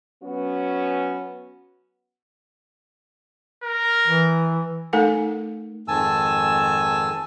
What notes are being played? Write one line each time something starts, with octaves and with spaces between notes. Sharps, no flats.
F#3 B3 C#4 F#4
A#4
E3
A3 D#4 A4 A#4 F#5 G#5
F2 G#2 D#3 G#5 A5 E6